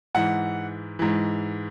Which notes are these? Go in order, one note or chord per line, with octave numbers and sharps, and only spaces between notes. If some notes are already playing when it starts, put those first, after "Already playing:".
G#2 E3 F#5
G#2 E3